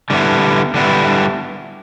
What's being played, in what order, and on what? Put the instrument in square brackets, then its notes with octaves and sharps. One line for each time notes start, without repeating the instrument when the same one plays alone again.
[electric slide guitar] D3 G3 B3 E4
D3 G3 B3 E4